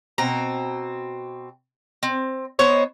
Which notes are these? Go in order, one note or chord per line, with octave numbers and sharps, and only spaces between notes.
B2 C4 A#5
C4
B3 D#4 C5 C#5